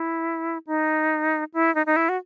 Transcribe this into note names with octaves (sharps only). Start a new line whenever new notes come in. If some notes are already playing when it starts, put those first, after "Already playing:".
Already playing: E4
D#4
E4
D#4
D#4
E4
F#4